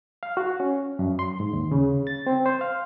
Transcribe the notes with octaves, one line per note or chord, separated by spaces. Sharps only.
F5
F#4
C#4
F#2
C6
G#2
D#2
C#3
A6
C4
C5
F5